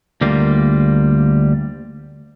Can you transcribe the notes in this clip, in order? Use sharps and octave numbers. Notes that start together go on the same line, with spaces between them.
D2 G3 A#3 F4